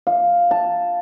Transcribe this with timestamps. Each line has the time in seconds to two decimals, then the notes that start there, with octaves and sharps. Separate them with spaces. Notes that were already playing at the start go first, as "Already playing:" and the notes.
0.07 F5
0.51 A5